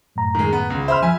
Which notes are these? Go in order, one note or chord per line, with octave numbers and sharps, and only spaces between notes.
F#2 A2 A#5
D#3 G#3
B3
C#2
C5 E5 B5 F6
F3 E5 G#5